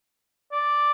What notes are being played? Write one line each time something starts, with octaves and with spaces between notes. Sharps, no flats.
D5